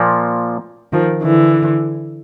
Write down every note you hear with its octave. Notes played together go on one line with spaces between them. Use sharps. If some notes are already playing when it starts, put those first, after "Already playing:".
Already playing: A#2 F3 A#3
D#3 F3
D3 E3